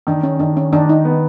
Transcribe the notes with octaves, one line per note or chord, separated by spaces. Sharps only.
D#3 D4
C#4
D#3 D4
C#4
D#3 D4
D#4
B3